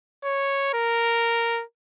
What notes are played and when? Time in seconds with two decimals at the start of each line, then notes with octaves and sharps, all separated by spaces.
0.25 C#5
0.74 A#4